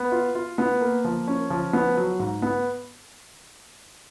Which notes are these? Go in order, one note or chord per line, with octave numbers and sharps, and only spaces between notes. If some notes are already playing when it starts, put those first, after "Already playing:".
Already playing: B3
F4
F4
B3
A#3
F3
C#4
F3
B3
F#3
G#2
B3